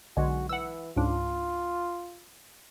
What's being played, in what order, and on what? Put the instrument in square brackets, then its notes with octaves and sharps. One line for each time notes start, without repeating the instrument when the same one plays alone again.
[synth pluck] B1 D3 G#3 [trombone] F#4
[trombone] E3 [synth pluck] F#5 E6
[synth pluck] C#2 G#2 D4 [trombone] F4